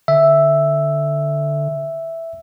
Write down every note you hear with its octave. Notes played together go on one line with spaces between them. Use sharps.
D3 E5